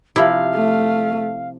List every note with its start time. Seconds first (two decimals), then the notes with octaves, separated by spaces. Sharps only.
0.16 C3 F3 E4 F5
0.54 A3